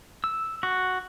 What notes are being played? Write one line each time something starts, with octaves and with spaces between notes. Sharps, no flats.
E6
F#4